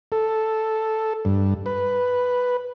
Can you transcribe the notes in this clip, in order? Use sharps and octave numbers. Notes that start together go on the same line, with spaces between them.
A4
G2
B4